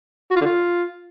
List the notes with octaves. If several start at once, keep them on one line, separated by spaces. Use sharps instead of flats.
F#4
F4
D3
F4